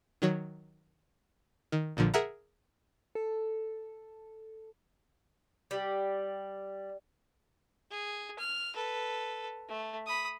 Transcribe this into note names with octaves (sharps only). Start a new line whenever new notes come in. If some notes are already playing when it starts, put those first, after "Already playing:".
D#3 F#3 C#5
D#3
A#1 A#2 D3 F3
G#4 A#4 E5 F#5 A#5
A4
G3
G#4
F6
A4 B4
A3
B5 D#6